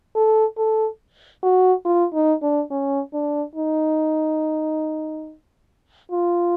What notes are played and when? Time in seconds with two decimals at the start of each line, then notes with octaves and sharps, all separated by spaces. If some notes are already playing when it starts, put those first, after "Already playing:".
0.15 A4
0.58 A4
1.43 F#4
1.85 F4
2.14 D#4
2.42 D4
2.71 C#4
3.13 D4
3.55 D#4
6.12 F4